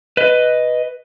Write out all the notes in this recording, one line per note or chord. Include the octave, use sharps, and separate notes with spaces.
B4 D#5